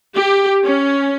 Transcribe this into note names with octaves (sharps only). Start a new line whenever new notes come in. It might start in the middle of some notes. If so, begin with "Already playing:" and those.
G4
C#4